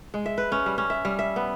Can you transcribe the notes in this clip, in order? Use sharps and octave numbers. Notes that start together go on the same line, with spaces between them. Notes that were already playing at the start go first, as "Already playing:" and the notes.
G#3
E5
B4
C#4
G3
C#4
E5
G3
E5
B3